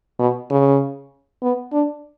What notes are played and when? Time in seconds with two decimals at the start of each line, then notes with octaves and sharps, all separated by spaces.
0.19 B2
0.50 C#3
1.43 B3
1.73 D4